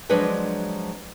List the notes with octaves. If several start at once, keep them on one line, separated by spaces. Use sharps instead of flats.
F3 F#3 G#3 D4 B4 D#5